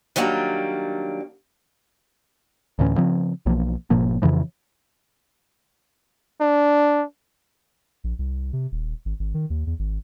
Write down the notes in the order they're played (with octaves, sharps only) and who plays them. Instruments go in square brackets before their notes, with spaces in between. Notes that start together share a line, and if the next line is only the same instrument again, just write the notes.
[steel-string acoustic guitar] D#3 F#3 G3 A#3 D4
[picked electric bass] D2 A2 E3 C#4
C#3 F3 C4
B1 E3 F3 A#3
G1 A#2 F3 A#3
F2 C#3 E3 F3
[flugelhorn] D4
[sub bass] A#1
C2
C3
D#1
G#1
G#1
D#3
D#2
E2
G#1